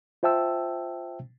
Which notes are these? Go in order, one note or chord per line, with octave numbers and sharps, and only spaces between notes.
F4 C5 E5 G5 A5 E6